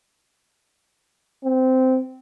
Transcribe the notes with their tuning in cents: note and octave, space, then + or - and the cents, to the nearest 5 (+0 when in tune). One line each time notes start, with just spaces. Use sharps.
C4 -15